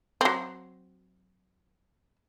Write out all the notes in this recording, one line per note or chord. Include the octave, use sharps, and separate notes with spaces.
F#3 C4